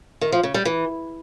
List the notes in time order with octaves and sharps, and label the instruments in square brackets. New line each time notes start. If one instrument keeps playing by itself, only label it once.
[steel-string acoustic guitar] D#3
F3
C#3
G3
E3